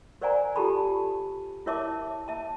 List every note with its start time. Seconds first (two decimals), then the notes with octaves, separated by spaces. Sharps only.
0.21 A#4 C5 D5 F#5 G#5 A#5
0.56 F4 G4 A4 A5 B5
1.66 E4 A#4 C#5 E5 A5 D6
2.28 E5 A5